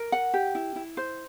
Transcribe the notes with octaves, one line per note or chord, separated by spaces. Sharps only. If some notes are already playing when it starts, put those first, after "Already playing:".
Already playing: A#4
F#5
G4
E4
E4
C5